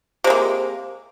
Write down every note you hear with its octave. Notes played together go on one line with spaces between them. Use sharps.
C3 G#3 A#3